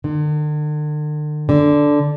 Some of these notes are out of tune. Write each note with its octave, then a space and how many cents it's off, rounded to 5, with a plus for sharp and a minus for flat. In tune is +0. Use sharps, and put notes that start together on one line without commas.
D3 +45
D3 -5